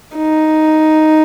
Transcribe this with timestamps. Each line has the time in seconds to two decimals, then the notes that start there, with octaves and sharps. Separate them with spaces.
0.16 D#4